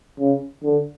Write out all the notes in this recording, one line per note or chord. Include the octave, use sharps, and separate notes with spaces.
C#3
D3